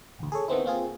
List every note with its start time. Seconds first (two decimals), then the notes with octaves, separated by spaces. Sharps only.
0.19 A1 D2
0.32 G#4 A4 C#5
0.48 D#3 B3 C4 E4
0.64 A#3 C4 F4 G#4